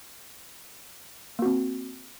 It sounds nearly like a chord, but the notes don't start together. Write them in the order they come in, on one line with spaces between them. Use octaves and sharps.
A#3 F#4 C4